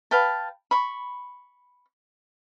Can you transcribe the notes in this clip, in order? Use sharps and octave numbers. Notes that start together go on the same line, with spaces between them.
B4 F5 G5 A5
B5 C#6